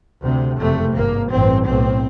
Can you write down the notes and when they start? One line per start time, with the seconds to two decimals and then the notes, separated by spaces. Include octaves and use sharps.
0.23 D2 C3
0.58 F#1 F2 C3 A3
0.94 G#1 G2 A#3
1.30 A1 G2 C4
1.65 B1 A2 C4